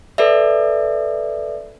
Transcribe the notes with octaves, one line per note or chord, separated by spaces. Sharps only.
A4 B4 D5 E5